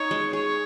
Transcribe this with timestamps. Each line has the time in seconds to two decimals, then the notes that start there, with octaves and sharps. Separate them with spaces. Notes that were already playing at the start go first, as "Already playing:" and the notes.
Already playing: D#4 C#5
0.11 G#3
0.33 G#4 C#5